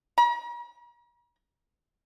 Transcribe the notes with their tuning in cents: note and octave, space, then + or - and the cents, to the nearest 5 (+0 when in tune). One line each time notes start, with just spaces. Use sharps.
A#5 +45